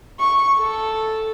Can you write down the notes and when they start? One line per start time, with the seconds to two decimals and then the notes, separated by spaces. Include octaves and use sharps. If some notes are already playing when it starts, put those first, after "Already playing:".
0.20 C#6
0.59 A4